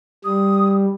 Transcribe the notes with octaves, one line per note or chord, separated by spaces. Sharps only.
G3 D#6